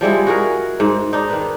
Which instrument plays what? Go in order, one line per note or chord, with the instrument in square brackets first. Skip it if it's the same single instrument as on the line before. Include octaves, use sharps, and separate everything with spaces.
[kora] F3 G3 G#3 E4
F#4 G#4 A#4
G#2
D4 D#4
D#3 B4